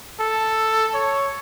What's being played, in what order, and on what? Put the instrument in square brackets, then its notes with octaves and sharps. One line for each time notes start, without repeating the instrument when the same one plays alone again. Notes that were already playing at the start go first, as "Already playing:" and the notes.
[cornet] A4
C#5